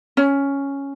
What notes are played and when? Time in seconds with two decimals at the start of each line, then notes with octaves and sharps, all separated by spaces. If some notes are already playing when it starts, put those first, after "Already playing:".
0.17 C#4